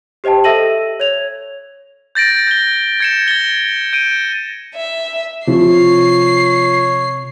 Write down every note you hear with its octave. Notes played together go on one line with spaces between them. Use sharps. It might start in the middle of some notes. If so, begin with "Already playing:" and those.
G4 C5 D#5 G5 A5
A4 E5 E6 A#6 D#7 F#7
C#5 G#6 F7
G6 A6 A#6 D7
G6 G7
G#6 C#7 E7
G#6 A6 G7
G6 D7 D#7
E5
C3 F3 C#5 C7